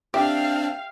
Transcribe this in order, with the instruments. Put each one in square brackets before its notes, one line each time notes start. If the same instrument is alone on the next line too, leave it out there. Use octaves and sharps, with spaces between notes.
[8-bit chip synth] C4 D4 [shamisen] G4 [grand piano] E5 G5 [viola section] F5